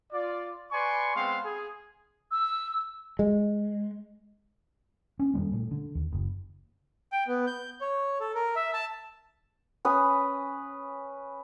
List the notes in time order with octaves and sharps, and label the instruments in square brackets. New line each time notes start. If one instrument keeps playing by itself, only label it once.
[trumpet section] F4 D5
B4 D5 G#5 C6 C#6
G#3 B3 C4 F5 C6
G#4
[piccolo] E6
[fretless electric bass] G#3
[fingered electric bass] C#4
F2 D#3 G3 A#3
A#2 A3
D3
D#2
F#1
[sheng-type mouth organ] G5
B3
G6
C#5
A4
A#4
E5
A5
[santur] C#4 B4 G#5 D#6